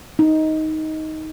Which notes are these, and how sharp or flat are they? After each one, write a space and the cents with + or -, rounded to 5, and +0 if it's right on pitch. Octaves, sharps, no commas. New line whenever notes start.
D#4 +10